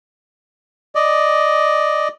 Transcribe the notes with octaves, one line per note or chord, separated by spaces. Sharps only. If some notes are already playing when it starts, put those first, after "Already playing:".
D5 D#5